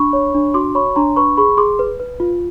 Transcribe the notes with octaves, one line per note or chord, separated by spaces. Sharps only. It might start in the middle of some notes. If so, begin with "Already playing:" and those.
Already playing: D4 B5 C#6
C#5
D4
F#4 C6 D6
C#5 B5 C#6
D4 A#5 C6
B4 B5 C#6
G#4 B5 C#6
G#4 C6 D6
B4
B4
F4